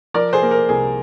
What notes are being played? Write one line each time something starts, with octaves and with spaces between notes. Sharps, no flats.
F3 A#4 D5
G#4 C5
A#3
A#4
C2 G#4